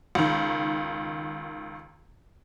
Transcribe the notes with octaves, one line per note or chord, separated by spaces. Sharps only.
C#2 D#3